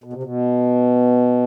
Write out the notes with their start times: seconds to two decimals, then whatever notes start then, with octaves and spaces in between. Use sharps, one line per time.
0.04 B2
0.13 C3
0.23 B2